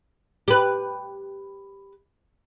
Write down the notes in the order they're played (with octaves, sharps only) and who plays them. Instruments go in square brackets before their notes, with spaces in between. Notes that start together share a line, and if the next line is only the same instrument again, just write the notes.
[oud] G4 B4